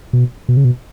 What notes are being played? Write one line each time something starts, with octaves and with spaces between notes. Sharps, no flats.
B2
B2
C#3
B2